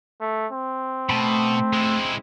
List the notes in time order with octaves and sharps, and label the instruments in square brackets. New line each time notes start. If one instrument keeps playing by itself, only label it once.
[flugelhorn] A3
C4
[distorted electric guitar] B2 [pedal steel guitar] A3 A5 B5
[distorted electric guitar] G#3 E4